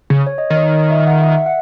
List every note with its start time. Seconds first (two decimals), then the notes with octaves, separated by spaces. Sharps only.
0.10 C#3
0.27 C#5
0.38 D#5
0.50 D#3 D#5
0.56 C#5
0.63 D#5
0.75 D#5
0.90 E5
1.07 F#5
1.22 E5
1.46 F#5